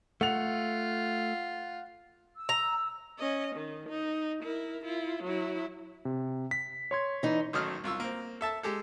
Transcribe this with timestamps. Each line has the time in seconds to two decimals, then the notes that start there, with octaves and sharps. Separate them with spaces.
0.21 A3 F4 F#5 F7
2.36 E6
2.49 A#5
3.19 C#4 D#5
3.55 D#3
3.89 D#4
4.43 E4 A#4
4.84 E4 F4
5.23 F#3 E4
6.05 C3
6.51 B6
6.91 C#5 C6 G#6
7.23 E3 D#4
7.53 A1 D#3 F#3 A3 D#6 F6
7.84 C2 F4 C#6 E6
8.00 A#3 C4
8.41 A4 E5 A5
8.63 G#3 G4 A4